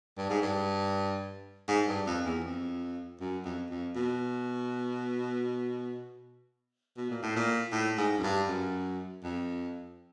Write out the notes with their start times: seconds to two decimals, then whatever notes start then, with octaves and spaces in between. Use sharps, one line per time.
0.18 G2
0.29 G#2
0.42 G2
1.68 G#2
1.88 G2
2.06 F2
2.25 E2
2.44 F2
3.20 F#2
3.45 F2
3.70 F2
3.95 B2
6.97 B2
7.10 A#2
7.23 A2
7.36 A#2
7.72 A2
7.98 G#2
8.18 F#2
8.23 G2
8.48 F#2
9.23 F2